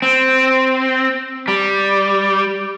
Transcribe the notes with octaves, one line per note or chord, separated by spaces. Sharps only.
C4
G3